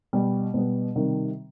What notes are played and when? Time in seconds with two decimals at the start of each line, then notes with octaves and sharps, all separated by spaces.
0.13 B2 G3 B3
0.54 B2 G3 B3
0.96 C3 D#3 G3